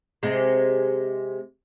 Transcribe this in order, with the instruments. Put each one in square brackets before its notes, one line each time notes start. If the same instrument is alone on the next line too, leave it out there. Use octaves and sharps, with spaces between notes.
[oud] C3 G#3